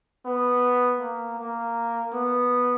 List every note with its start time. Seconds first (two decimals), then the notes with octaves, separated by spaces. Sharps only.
0.26 B3
1.01 A#3
1.38 A#3
2.13 B3